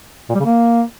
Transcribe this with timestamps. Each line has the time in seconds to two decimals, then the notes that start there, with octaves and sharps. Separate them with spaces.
0.29 A#2
0.35 G3
0.40 C#3
0.45 A#3